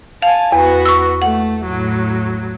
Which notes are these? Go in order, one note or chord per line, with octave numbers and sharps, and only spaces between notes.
F5 G#5 A5
E2 B3 F#4
C#6 E6
A3 F#5
A2 F#3